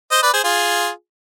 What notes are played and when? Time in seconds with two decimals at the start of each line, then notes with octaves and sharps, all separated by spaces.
0.11 C5 D#5
0.23 B4 D5
0.33 G#4 C5
0.44 F4 G#4